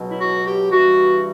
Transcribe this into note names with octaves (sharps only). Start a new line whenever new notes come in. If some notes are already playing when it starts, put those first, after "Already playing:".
Already playing: C#2 B2 F#3
E4
F#4
G4
G2 E3 G3 F#4